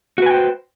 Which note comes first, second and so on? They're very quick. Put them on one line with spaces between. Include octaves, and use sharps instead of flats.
F#4 B4 G#5 G5 C5